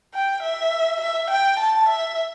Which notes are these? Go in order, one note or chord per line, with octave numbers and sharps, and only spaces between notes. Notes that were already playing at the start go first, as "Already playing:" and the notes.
G5
E5
E5
G5
A5
E5